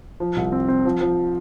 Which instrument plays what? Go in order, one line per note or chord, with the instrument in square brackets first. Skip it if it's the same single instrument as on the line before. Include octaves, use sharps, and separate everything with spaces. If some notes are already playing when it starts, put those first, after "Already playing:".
[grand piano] F3
C2
C4
C4
F3
F3